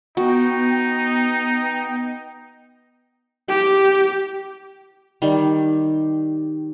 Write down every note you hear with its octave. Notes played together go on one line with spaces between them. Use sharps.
B3 D#4 F#4 G5
G4
D#3 G3